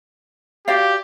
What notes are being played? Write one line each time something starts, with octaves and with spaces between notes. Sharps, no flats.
F#4 G4 D5 F5